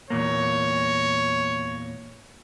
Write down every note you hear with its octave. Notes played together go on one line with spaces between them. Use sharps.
E2 A#2 A#3 C#5